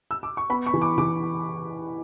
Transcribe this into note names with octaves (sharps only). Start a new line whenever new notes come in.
E6
D6
C#6
B3 B5
C#6
E3
D6
E3 D6